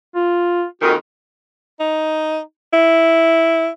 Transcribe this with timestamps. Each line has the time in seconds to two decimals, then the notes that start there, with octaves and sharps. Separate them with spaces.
0.15 F4
0.82 F2 A#2 D#3 F#4
1.80 D#4
2.73 E4